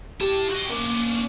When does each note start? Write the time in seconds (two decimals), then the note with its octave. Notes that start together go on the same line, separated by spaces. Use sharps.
0.21 E4 G4 A5
0.51 F#4 D#5
0.70 A#3 C#4 D4